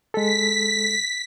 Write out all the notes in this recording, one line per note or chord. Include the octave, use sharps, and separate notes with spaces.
G#3 A4 B6